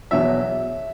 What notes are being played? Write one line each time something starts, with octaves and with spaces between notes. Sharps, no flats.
E2 B2 F#3 E5